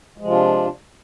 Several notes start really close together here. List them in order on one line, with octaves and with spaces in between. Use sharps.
G#3 F3 C3 F4 D4